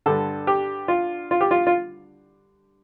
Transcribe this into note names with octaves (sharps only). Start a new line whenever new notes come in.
G2 D3 G3 A4
G4
F4
F4
G4
F4
F4